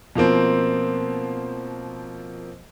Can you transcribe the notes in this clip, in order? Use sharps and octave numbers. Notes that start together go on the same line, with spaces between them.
B2 F3 A#3 C4